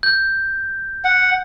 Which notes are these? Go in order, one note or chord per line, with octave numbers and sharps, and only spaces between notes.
G6
F#5